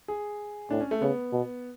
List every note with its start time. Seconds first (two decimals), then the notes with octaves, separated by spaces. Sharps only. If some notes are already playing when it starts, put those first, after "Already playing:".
0.08 G#4
0.70 A2 D4
0.81 C#4
0.91 A3
1.01 C#3 B3
1.32 B2